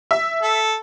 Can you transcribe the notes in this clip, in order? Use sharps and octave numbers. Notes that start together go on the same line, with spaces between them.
E5
A4